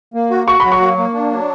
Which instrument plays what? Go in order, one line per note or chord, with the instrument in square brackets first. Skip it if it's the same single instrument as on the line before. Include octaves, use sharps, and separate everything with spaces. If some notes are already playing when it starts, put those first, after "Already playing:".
[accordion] A#3
F#4
[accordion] F#4 [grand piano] C#6
[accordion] F#3 [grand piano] B5
[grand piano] C#6
[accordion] A#3
A#3
D4
F#3